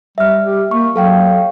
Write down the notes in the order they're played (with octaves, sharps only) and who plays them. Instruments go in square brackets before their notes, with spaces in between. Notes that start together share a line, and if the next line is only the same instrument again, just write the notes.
[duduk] G3 [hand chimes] E5 F6
[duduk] G4
[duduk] A#3 [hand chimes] C#6
[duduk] F#3 [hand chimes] A4 F5 G5